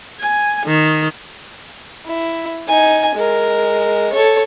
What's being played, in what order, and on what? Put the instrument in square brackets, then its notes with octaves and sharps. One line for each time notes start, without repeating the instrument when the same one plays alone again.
[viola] G#5
D#3
[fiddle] E4
D#4 G#5
G#3 A#4
A4 C#5